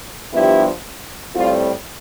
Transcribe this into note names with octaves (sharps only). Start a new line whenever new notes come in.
G2 F3 B3 D4 E4 G4
A2 G3 C4 F4